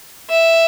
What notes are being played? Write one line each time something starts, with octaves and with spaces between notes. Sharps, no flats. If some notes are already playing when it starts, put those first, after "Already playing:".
E5